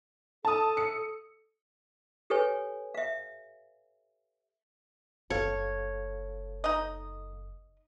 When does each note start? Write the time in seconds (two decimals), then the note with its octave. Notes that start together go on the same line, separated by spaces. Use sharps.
0.45 A4 A5 D#6
0.77 C#7
2.30 G4 A4 B4 C#5 G#5
2.94 E5 F5
5.30 F#1 A3 A4 C#5 F5
6.64 D#4 D#5